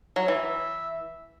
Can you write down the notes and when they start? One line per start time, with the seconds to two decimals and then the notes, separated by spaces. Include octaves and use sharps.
0.16 F#3
0.28 E3 E5